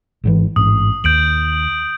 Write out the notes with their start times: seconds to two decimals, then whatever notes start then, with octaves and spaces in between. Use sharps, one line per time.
0.24 G#1 G#2 E3
0.56 A1 G#2 D#6
1.04 D#2 G6 D7 F#7